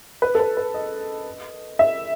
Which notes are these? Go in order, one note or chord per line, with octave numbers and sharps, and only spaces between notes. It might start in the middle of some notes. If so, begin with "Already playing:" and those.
B4
A4
B4
B4
D#5
E5